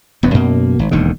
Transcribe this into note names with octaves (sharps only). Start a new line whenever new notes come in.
E1 F#2 B3
F#2 B2 A#3
G#1
E1 D#2 D3 D#3